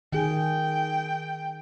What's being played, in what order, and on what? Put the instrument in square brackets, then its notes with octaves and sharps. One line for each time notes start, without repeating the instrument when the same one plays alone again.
[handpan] D#3 G#4 [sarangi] G5